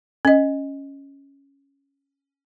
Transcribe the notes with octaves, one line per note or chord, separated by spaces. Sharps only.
C#4 D#5